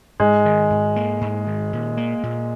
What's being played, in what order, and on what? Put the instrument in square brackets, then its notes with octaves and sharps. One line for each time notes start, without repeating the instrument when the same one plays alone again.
[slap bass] G#2 [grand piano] G#3
[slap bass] D#3
G#2
A#3
G#2
D#3
A#2
A#3
A#2